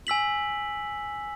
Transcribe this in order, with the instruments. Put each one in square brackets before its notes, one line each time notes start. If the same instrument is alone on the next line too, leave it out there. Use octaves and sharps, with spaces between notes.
[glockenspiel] G#5 E6 B6 F#7